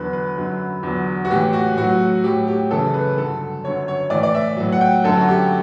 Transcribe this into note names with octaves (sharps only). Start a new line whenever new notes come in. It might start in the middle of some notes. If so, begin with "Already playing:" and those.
Already playing: E2 D3 F#3 B4
B4
F#2 D3 F#3
E2 D3 F#3
F#4
A2 E3 G4
F#4
A2 F#3 F#4
A2 F#3 G4
G4
F#2 C#3 E3 A4
B4
G2 D3 F#3 A4
F#2 D3 F#3 C#5
C#5
A2 E3 D5
D5
E5
A2 F#3
F#5
G5
F#2 D3 F#3 A4
F#4
G4